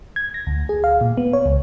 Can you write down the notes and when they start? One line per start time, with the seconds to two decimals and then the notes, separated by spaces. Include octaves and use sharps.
0.16 G#6
0.34 A#6
0.47 D2
0.69 G#4
0.84 F5
1.01 A#2
1.17 B3
1.33 C#5
1.46 C#2